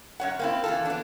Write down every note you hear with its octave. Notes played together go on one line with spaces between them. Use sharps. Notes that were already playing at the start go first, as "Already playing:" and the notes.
F#2 C#5 F#5
A#3 C4 E4
E3 F4 A4
B3 D4